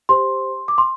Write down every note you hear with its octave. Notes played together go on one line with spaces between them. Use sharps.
G4 C5 C6
D6
C6